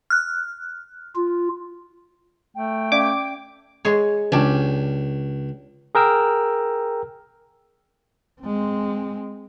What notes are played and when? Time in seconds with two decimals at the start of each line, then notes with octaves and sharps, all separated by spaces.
0.10 F6 F#6
1.15 F4
2.55 A3 G5
2.92 C#4 D5 F5 D6
3.85 G#3 G#4 C#5
4.32 C#2 C#4 D4 G4
5.95 G#4 A#4 G5 E6
8.41 G#3 C4